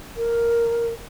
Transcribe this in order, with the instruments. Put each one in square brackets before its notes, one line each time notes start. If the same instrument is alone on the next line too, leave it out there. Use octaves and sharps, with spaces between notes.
[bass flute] A#4